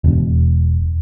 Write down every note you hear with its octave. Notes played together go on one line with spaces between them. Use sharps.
E1